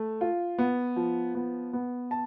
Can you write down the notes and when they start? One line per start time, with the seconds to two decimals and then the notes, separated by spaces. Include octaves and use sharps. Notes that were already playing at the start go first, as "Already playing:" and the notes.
Already playing: A3
0.21 F4
0.59 B3
0.96 F3
1.35 B3
1.73 B3
2.11 A5